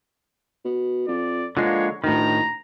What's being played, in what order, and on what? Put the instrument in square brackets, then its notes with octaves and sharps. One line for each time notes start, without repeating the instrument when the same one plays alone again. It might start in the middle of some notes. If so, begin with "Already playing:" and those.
[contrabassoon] B2
[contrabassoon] F2 [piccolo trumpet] D5
[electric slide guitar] D3 G#3 A#3 [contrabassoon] F3 [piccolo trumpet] C#5
[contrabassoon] D2 [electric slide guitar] A2 D#3 [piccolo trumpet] A#5